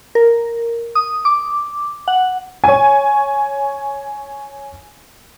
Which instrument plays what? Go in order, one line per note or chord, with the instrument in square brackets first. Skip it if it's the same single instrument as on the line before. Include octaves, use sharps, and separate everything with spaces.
[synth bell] A#4
D#6
D6
F#5
[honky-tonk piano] C#5 G#5